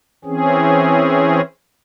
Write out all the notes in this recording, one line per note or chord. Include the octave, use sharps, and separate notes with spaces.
E3 C4 C#4 G#4